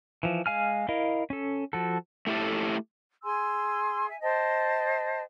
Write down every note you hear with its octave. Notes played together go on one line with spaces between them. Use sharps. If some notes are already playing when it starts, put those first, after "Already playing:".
E3 F3
G#3 F5 G#5 F6
E4 A#4 D#5 F5
C#4 A4
F3 F#4 A4
A3 E4 G4 A4
G#4 G#5 C6 E6
E5 G#5
C5 D#5 G5 A5